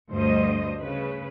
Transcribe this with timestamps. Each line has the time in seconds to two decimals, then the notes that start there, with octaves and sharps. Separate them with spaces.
0.12 D2 G2 G3 C5 D#5
0.80 C#3 B4